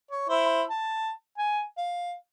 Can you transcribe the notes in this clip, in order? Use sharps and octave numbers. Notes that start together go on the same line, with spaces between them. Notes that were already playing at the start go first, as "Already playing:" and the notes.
C#5
E4 C5 E5
A5
G#5
F5